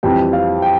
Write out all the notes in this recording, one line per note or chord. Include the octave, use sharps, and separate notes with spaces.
F2 E3 G3 G5
F5
G5